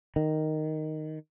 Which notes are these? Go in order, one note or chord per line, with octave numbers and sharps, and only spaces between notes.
D#3